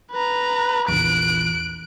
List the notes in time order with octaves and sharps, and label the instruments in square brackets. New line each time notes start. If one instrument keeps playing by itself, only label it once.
[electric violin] B4 A#5
[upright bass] A#1 E2 [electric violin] F#6 D7